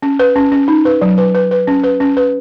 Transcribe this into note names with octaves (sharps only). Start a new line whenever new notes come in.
C#4
B4
C#4
C#4
D#4
B4
F#3
B4
B4
B4
C#4
B4
C#4
B4